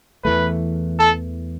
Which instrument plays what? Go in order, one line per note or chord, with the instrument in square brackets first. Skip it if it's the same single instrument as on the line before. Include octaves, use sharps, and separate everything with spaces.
[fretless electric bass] E2 E3 A3 [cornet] B4
[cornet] A4